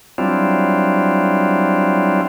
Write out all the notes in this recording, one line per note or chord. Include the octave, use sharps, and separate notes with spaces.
F#3 G3 C4 D4 E4 F4